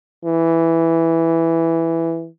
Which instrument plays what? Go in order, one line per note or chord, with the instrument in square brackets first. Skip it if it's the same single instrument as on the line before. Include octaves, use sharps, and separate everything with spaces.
[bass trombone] E3